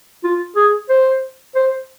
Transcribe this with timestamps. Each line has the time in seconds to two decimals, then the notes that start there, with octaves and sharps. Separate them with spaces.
0.24 F4
0.56 G#4
0.90 C5
1.55 C5